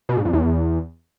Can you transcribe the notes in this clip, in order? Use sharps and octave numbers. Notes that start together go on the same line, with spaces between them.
B2
G#2
F2
E2